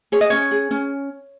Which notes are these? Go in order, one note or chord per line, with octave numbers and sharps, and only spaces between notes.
G#4 C#5
D#5
C#4 C#5
G#4
C#4